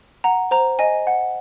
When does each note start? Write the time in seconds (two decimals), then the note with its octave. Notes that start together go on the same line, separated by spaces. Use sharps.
0.24 F#5 A#5
0.51 C5 A#5
0.79 D#5 G#5
1.07 F#5